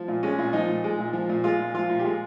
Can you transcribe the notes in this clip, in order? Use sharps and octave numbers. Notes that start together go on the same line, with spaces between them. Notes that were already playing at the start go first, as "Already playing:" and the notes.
Already playing: F3
A#2
G#3 C#4
A#2
F3 D#4
A#2
G#3
A#2
F3
A#2
G#3 F4
A#2
F3 F4
A#2
G4
G#3 F4